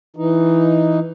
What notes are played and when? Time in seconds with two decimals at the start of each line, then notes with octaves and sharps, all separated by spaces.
0.16 E3 D#4